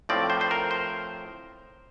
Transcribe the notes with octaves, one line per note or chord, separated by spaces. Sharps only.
A2 F3 C4 D5
C5
C5
A#4
C5